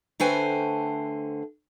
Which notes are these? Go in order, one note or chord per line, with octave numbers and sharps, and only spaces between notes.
D3 A3 B4 C5 G5 G#5